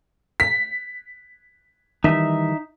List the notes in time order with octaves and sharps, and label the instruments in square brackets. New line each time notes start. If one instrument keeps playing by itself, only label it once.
[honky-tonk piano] B6
[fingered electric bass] D#3 E3 G3 [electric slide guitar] D#4 E5